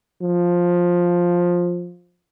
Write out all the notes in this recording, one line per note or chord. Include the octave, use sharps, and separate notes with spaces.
F3